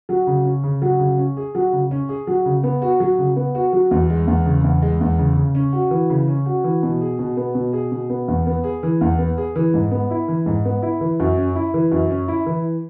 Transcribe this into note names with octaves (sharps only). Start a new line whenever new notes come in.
F#3
C#3
C#4
C#3
F#3
C#3
C#4
G#4
F#3
C#3
C#4
G#4
F#3
C#3
B3
F#4
F#3
C#3
B3
F#4
F#3
E2
G#3
E2
C#3
E2
G#3
E2
C#3
C#3
C#4
F#4
E3
C#3
C#4
F#4
E3
B2
G#4
B2
B3
B2
G#4
B2
B3
E2
B3
G#4
E3
E2
B3
G#4
E3
G#2
B3
E4
E3
G#2
B3
E4
E3
F#2
C#4
E4
E3
F#2
C#4
E4
E3